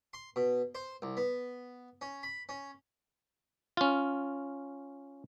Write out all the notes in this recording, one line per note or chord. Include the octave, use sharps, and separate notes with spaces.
C6
B2
C5
C2
B3
C#4
B5
C#4
C#4 F4